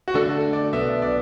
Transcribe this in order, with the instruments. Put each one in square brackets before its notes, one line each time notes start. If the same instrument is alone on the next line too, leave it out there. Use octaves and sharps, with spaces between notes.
[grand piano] F#4
[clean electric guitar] D3 A3 D4 [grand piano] A4
[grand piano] D5
[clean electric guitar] B1 B2 B3 D4 [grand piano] E5
[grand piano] D5